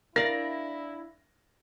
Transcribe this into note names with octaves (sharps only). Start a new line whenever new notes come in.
D4 E4 A#4 D5 F5 A#6